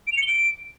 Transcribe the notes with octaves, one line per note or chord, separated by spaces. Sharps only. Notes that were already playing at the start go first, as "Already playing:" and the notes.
D7
F7
C#7
G7
D7